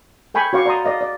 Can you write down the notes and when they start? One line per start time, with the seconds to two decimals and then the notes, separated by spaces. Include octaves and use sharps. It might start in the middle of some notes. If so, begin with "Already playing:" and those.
0.34 A4 G5 G#5 B5 C#6
0.53 F#4 C#5 F5 C#6 D6
0.66 D5 A#5 C6 D#6
0.85 D5 D#5 F5
1.01 D5